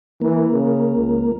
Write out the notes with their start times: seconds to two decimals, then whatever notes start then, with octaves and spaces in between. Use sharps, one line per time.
0.22 E3 A#3
0.52 C#3
0.96 C#2